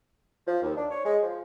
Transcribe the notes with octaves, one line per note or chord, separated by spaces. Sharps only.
F3
D#2
D4
C#5
G#3
F3